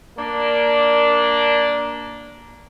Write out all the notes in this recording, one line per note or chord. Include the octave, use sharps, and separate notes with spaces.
A#3 D4